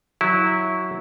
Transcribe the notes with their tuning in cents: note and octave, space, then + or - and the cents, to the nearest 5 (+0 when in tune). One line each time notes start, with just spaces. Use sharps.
F#3 +0 E4 -15